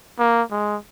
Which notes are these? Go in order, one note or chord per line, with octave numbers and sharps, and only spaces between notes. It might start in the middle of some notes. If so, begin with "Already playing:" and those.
A#3
G#3